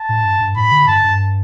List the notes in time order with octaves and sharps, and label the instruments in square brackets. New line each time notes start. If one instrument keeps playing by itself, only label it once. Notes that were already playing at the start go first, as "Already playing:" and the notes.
Already playing: [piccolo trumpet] A5
[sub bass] A2
G2
G2
[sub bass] A2 [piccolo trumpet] B5
[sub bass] D3
[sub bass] G2 [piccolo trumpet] A5
[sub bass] G2